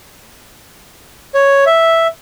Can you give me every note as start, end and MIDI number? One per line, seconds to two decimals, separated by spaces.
1.34 1.64 73
1.66 2.07 76